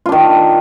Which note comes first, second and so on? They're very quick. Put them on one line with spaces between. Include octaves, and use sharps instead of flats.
F4 D4 D#3